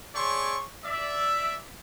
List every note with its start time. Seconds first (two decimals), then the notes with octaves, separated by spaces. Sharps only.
0.15 A3 G#4 C#5 D5 C6 C#6
0.84 D5 E5